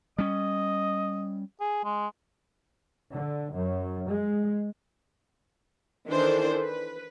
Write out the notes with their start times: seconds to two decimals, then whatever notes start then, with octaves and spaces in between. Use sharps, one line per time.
0.18 G3 C#4 D#5
1.61 G#4
1.84 G#3
3.14 D3
3.52 F#2
4.09 G#3
6.08 D#3 E3 D4 A4 C5
6.60 B4